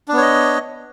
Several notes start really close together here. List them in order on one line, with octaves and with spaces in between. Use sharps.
D4 B3 C#5 D#5